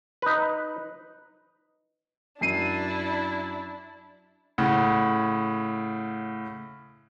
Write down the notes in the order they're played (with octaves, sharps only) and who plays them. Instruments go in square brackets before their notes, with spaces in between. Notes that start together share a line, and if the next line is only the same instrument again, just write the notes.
[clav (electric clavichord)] D#4 B4
[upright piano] F#2 C7 D#7 [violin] D4 E4
[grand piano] A2 C#3 F#5